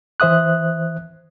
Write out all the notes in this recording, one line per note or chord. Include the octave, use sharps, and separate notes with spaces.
E3 C5 E5 D#6 F#6